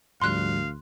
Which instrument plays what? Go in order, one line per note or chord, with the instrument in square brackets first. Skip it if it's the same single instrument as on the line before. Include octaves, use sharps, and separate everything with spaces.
[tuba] D2 [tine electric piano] G#2 F3 G3 [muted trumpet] F5 [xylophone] C6 F#6